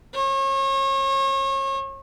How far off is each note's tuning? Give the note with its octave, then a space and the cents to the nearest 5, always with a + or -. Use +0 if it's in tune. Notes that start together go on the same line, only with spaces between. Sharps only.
C#5 -35